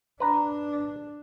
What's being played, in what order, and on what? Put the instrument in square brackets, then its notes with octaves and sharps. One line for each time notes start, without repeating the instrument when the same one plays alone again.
[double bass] D4 [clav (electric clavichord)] B4 A#5